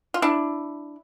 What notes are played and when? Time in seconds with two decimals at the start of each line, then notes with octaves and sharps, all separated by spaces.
0.14 F4
0.22 D4 E4